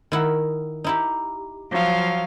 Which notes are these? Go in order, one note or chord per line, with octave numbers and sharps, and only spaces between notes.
D#3 E4 F#5
D#4 E4 G4
F3 F#3 F5